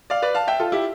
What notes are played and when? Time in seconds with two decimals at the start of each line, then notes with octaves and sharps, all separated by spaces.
0.10 D5 F5
0.22 B4 D5
0.35 F5 A5
0.47 E5 G5
0.60 F4 A4
0.72 E4 G4